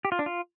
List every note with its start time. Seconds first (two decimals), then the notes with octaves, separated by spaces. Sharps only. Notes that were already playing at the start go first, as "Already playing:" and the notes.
0.05 G4
0.12 F4
0.19 D4
0.26 F4